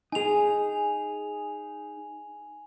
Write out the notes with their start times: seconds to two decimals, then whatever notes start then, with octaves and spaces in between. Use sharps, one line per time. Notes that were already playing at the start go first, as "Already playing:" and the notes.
0.12 D#4 G#4 G#5 F7